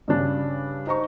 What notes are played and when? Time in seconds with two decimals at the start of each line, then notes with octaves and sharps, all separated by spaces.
0.08 G2 C#3 D4
0.87 D#4 C5 A#5 C#6